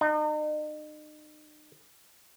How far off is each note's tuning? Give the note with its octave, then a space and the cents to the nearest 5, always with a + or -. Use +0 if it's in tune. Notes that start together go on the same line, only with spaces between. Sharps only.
D#4 -40